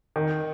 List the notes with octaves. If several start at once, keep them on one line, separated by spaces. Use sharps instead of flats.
D#3